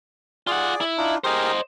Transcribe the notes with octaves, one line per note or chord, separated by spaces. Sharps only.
F4 G#4 D5 F#5
E4
D4 D#4 F4
G4 G#4 A#4 C5 D#5